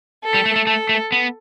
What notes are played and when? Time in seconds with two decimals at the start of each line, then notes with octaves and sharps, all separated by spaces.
0.23 A4
0.34 G3
0.46 A3
0.56 A3
0.67 A3 A4
0.89 A3
1.12 B3